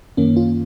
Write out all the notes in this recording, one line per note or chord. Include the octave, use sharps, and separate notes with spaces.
F#2 D#3 A#3 C#4
C#4 F4